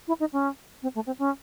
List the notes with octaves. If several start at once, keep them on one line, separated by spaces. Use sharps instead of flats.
E4
D#4
C#4
C4
A3
C4
C#4